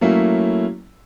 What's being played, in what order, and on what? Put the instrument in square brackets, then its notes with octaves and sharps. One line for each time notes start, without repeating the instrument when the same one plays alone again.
[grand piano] F#3 A3 A#3 C#4 E4